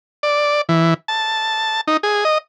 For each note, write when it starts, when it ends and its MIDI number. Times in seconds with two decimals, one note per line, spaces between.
0.23 0.61 74
0.69 0.94 52
1.08 1.81 81
1.88 1.97 63
2.03 2.24 68
2.25 2.38 75